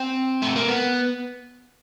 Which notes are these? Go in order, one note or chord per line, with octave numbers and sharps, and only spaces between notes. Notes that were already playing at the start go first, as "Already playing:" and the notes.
Already playing: C4
A3
A#3
B3